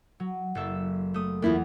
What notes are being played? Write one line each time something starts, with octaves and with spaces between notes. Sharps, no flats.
F#3
F#1 A4 E5
A3 D#6
E2 A#3 B3 E4 F4